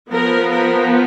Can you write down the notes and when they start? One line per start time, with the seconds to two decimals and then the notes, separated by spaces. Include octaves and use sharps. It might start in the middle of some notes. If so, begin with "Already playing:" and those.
0.11 F3 B3 A#4
0.50 A#4